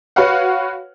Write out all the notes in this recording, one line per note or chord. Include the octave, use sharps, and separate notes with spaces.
F#4 B4 C#5 F5 F#5